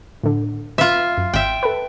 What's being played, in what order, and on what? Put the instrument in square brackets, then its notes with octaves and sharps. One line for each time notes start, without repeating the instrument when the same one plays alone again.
[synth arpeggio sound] A2 D3
[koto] F4 E5 [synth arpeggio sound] B4
[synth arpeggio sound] F#2
[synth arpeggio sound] G#1 [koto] E5 G5
[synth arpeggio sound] A4 B4